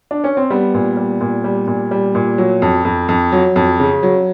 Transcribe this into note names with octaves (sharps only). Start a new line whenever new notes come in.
D4
C#4
C4
G3 B3
A#2
G3
A#2
G3
A#2
G3
A#2
F#3
F2
F2
F2
F#3
F2
C#3
F#3